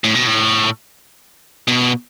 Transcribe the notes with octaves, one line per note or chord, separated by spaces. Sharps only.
A2
B2
A2
B2